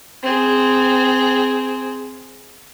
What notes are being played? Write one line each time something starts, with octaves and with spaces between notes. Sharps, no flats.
C4 G#4